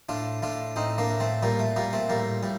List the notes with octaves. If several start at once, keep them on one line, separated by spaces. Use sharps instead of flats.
A2 D4 F4
A2 D4 F4
A2 C4 D#4
A#3 D4
A2
A3 C4
A#2 G3 A#3
A3
A#2 G3 A#3
A3 C4
A2 G3 A#3
A2 G3